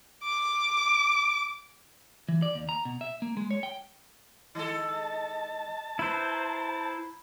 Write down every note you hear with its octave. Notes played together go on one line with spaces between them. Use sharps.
D6
E3
D5
D#2
A#5
B2
E5
A#3
G#3
C#5
G5
D#3 G#3 A4 D#5
A5
E4 B4 C5 A#5